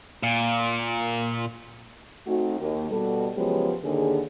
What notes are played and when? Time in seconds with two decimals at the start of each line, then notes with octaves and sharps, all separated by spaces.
0.23 A#2
2.27 A3 C4 D#4 F#4
2.60 D#2
2.90 B2 G3 A4
3.35 C#3 F3 F#3 G#3 B3 G4
3.83 D#2 D3 G#4